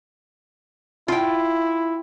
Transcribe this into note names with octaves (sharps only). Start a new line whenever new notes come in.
E4 F4 G5